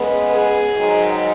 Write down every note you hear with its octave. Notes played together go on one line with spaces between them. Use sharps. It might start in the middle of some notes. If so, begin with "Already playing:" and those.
Already playing: C#3 G#3 B3 B4
G#4
G#2 D#3 F#3